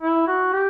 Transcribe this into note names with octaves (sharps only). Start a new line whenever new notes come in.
E4
F#4
G4